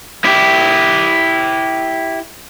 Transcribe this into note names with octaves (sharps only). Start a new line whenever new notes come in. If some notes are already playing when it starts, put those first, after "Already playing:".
E4 G4